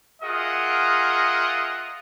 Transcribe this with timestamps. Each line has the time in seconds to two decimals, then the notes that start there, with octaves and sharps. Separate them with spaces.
0.23 F4 G#4 A#4 D#5 E5 F#5